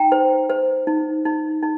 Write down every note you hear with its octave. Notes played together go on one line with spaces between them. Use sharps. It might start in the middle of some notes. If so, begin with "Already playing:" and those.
Already playing: D#4 G5 A#5
C5
C5
D#4
D#4
D#4